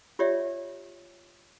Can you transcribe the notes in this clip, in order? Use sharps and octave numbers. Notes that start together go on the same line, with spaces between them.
F4 G4 C#5 D5 E5 F#5